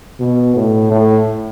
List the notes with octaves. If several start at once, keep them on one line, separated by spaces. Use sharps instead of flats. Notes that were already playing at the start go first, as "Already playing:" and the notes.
B2
A2
A2